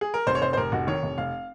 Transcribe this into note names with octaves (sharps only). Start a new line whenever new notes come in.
G#4
A#4
F1 C5
C#5
F1 C5
C5
F1 A#4
F1 F#4
D#3 C#5
F1
F1 F5